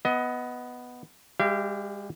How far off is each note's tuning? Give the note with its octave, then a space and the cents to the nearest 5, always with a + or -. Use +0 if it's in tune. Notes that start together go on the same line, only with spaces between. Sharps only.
B3 +0 D#5 +20
G#3 -45 G4 -10 F5 -40